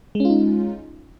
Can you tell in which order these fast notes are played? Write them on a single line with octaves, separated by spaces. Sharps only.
G#3 C#4 F4 D#4